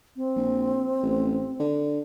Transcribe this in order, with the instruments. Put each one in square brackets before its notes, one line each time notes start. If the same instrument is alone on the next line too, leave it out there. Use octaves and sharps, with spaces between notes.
[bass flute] C4
[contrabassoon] A#1
A1
D3